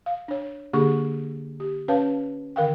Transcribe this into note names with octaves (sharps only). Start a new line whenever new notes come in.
F5
D4 C#5
D3 A#3 D4 G4 G#4 C#6
G4
C#4 B4 C#5 F5 A5
D3 D#3 A#4 F5 G5